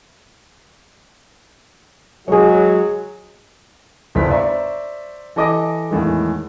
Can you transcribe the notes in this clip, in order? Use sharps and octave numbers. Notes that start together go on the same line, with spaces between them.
F#3 G#3 G#4 C#5
G1 E4 C5 B6
C5 D5 E5 A#5 C#6
E3 A4 D#5 D6 D#6 A#6
E2 A2 D#3 G#3